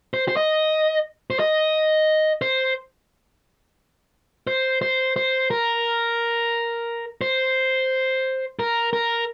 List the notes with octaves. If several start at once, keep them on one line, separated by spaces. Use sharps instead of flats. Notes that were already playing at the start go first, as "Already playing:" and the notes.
C5
C5
D#5
C5
D#5
C5
C5
C5
C5
A#4
C5
A#4
A#4